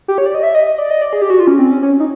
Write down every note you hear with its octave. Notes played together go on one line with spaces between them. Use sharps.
G4
C#5
D5
D#5
E5
D#5
D#5
D5
D#5
D5
G#4
G4
F#4
F4
C#4
C4
C#4
C#4
D#4